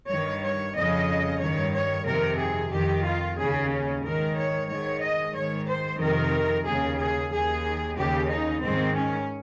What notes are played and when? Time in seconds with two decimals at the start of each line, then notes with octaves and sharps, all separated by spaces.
0.09 G2 D#3 C#5
0.42 C#5
0.76 F2 C#3 D#5
1.40 G2 D#3 C#5
1.73 C#5
2.06 F2 C3 D#3 A#4
2.39 G#4
2.72 F2 D#3 G4
3.05 F4
3.37 D#2 C#3 G#4
3.70 C#4
4.03 G#2 D#3 A#4
4.36 C#5
4.69 G#2 D#3 C#5
5.02 D#5
5.34 G#2 D#3 C#5
5.67 C5
5.99 F2 C3 D#3 A#4
6.65 D#2 C#3 G#4
6.98 G#4
7.31 D#2 D#3 G#4
7.96 D#2 C#3 G4
8.30 D#4
8.62 G#2 D#3 C4
8.95 C#4